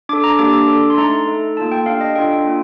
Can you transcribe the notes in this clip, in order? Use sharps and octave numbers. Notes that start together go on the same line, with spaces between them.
D4 A4 D6
A#5
A#3 D4 G4 D6
D4 A4
C6
A3 D#4 A4 A#5
A3 D#4 A4
A#3 F4 A4 A5
G5
D4 G4 F5
D#5
D4 F4 A4 G5
A#3 F4